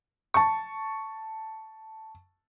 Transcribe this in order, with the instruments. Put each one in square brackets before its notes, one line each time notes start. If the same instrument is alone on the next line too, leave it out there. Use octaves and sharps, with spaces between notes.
[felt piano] A5 C#6